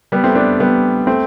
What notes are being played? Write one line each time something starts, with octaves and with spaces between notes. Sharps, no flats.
G3 B3
A3 C4
B3 D4
G3 B3
A3 C4